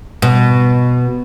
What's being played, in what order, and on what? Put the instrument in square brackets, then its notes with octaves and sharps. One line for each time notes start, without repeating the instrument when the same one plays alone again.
[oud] B2